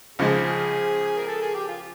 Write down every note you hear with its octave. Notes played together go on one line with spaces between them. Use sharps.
C#2 C#3 F3 G#3 G#4
A#4
A4
G#4
G4
F4